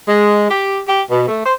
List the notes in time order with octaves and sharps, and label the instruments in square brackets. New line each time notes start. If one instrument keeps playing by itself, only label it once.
[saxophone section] G#3
G4
G4
B2
A3
C5